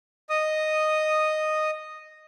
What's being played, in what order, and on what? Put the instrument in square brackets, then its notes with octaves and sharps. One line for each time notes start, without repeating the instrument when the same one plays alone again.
[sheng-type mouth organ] D#5 D#6